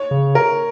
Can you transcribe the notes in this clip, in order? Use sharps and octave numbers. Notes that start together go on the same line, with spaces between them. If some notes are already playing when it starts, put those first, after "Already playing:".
Already playing: C#5
C#3
A#4